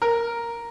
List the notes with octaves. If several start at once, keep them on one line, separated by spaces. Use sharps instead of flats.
A#4